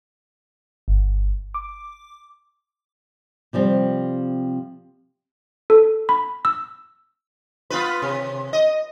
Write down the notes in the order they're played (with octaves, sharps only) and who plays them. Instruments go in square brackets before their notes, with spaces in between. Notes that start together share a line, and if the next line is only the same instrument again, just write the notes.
[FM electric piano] G1
D6
[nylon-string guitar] C3 F3 G3 C4
[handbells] A4
B5
E6
[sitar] B3 F4 B4
C3
D#5